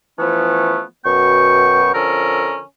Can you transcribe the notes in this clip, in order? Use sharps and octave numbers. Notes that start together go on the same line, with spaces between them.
E3 F3 A3 B3 C#4
F#2 B2 B3 G5 C#6
D3 F3 C#4 A4 A#4